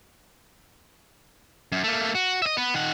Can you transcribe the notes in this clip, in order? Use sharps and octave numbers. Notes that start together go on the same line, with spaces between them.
F#2
A3 A#3
F#4
D#5 E5
B3
D#3 F#5